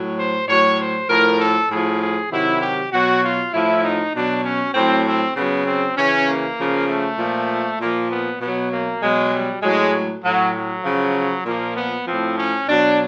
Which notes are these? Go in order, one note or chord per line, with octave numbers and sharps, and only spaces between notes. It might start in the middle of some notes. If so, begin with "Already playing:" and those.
Already playing: A2 F#3
C5
A2 F#3 C#5
C5
A2 F3 A#4
A4
A2 F3 G#4
G#4
C3 D#3 F#3 E4
G4
B2 F#3 F#4
F4
A2 F3 E4
D#4
B2 F#3 D4
C#4
A2 F#3 C4
C4
C#3 F#3 B3
C4
C#3 E3 C#4
A#3
C#3 F3
A3
A#2 F3
A#2 F3 A#3
B3
B2 F#3 B3
A#3
B2 F#3 G#3
G3
A2 F#3 G#3
A2 F#3
F#3
C#3 F3
A#2 F3 A#3
B3
A2 F3 C4
C#4
B2 F#3 D4